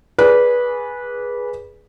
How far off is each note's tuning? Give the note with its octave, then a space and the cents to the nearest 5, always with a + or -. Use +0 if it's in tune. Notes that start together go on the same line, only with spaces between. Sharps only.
G#4 +0 B4 -15 D5 -20